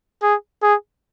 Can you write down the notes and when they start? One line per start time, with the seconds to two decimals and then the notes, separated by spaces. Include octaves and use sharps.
0.23 G#4
0.62 G#4